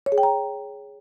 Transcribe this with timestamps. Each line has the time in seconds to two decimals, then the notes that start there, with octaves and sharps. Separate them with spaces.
0.06 C#5
0.12 G#4
0.18 G5
0.23 A#5